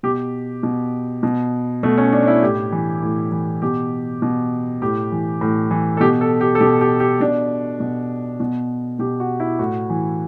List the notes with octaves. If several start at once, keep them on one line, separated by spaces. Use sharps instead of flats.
B2 G4
B2
B2
B2 A3
C#4
D4
D4
E4
A2 G4
E3
A2
E3
B2 G4
B2
A2 G4
E3
A2
E3
A4
B2 G4
A4
G4
A4
B2 G4
G4
G4
B2 D4
B2
B2
B2 G4
F#4
E4
A2 F#4
E3